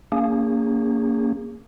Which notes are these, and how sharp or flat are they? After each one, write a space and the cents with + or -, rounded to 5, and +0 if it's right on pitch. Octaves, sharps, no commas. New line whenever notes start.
A#3 -15 C#4 +30 G#4 -30